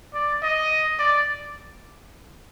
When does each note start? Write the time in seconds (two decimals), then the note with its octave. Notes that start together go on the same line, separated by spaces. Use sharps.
0.14 D5
0.43 D#5
0.99 D5